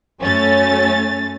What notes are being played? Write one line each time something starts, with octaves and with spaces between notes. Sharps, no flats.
F#2 A3 C#4 A6